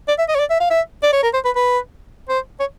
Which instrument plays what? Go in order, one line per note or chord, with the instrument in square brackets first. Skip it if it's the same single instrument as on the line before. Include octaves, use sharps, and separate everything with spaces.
[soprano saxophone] D5
E5
D#5
C#5
D5
E5
F5
E5
D5
C#5
A#4
C5
B4
B4
C5
C#5